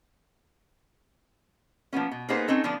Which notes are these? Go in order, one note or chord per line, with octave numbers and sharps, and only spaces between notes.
F3 A#3 B3 C#4
B2
A#3 B3 D#4 G#4 B4 C5
C4 C#4 D#4 A4
D3 F3 B3 D4